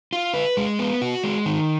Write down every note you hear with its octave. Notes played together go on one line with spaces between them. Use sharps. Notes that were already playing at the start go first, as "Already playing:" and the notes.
F4
B4
G#3
B3
F#4
G#3
D#3